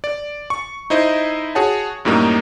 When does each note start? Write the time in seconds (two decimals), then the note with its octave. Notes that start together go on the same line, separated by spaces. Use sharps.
0.04 D5
0.50 C#6
0.90 D#4 E4 C5 D#5
1.55 F#4 G#4 C#5 F#5 A5
2.05 F#2 A2 G3 A#3 D#4